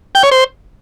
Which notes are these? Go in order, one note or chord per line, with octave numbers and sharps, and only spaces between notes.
G5
C#5
C5